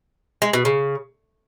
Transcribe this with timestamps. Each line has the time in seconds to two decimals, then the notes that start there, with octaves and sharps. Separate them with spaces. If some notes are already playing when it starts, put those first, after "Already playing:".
0.42 G#3
0.53 B2
0.65 C#3